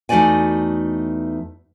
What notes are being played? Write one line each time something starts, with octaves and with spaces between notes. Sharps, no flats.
E2 A3 D#4 F#4 D5 G#5